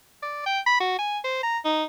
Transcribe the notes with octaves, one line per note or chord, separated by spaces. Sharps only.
D5
G5
B5
F#4
G#5
C5
A#5
D#4